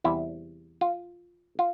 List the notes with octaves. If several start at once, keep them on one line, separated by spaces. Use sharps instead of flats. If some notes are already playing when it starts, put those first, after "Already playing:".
E2 C3 G3 E4
F4
F4